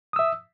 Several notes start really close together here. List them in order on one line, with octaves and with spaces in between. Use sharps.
D#6 E6 E5